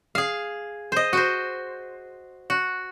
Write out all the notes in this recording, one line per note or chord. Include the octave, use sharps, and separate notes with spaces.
G#4 F5
C5 D#5
F#4 C5
F#4